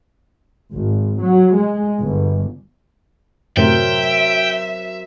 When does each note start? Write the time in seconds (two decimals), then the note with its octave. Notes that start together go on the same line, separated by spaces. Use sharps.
0.75 G#1
1.21 F#3
1.57 G#3
2.02 G1
3.57 F#2 A2 C3 F#3 A#4 C5 E5 G5